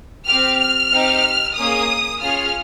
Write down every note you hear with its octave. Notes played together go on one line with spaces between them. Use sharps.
C4 G4 F6
F6
C4 D#4 G4
A#3 C#4 G#4 D#6
C#4 F4 G#4 F6